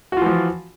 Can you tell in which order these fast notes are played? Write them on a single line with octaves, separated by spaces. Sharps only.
F#4 F4 E3 F3